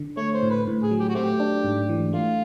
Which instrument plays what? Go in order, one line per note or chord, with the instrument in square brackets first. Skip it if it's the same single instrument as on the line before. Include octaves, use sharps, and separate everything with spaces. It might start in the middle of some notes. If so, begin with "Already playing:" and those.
Already playing: [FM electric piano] D3
[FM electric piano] A3 [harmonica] C#5
[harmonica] C5
[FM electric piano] A2
[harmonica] B4
[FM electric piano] A2
[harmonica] G#4
[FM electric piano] F#3
[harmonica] G4
F#4
[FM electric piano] A3 [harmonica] C4 G4
[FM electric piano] D4
G#2
E3
[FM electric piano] A3 [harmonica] F4